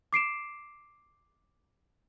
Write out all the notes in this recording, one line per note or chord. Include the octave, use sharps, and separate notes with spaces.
D6 C7 D7 E7